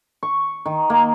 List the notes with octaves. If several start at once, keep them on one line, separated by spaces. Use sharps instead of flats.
C#6
D#3
A#3